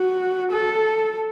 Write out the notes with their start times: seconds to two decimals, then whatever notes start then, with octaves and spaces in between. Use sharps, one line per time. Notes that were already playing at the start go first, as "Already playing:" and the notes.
Already playing: F#4
0.51 A4